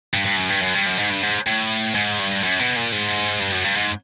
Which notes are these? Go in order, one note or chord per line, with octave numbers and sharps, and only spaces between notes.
G2
G2
F#2
G2
F#2
G2
F#2
G#2
G2
G#2
A2
G#2
G2
F#2
B2
A#2
G#2
G2
F#2
G2
G#2